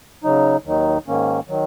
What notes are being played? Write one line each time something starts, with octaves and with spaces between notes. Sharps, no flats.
C#3 F#3 D#4
D#2 D#3 F#3 D#4
G#2 D#3 A#3 C#4
D#3 F#3